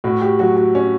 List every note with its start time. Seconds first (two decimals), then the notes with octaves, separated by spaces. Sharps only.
0.04 A2 F#4
0.21 G4
0.39 F#3 F#4
0.57 F#4
0.75 C#4